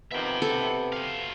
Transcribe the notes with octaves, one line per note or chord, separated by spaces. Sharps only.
F2 C3 D#3 B3 E5 G5
C3 A4
F#3 F5